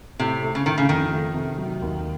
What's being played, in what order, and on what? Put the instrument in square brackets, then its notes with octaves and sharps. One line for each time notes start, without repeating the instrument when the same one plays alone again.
[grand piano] A2 [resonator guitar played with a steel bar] C3
[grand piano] A3
[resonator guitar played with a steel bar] C#3
[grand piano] A2 [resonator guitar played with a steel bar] D#3
[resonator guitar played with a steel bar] C#3
[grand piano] F2 [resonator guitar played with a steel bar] D#3
[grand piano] A3
C3
F#3
D#2